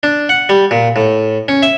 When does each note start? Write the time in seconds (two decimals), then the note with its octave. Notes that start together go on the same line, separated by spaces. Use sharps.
0.03 D4
0.29 F#5
0.49 G3
0.71 A#2
0.96 A2
1.48 C#4
1.63 E5